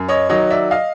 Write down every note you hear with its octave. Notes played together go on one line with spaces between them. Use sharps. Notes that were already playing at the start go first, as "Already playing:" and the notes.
Already playing: F#2
C#5 D#5
D#3 F#3 C#5 D#5
D5 E5
D#5 F5